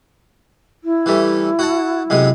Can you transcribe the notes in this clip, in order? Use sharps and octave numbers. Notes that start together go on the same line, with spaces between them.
E4
E3 G3 A3
F#4 F#5 A5
F#2 C3 G#3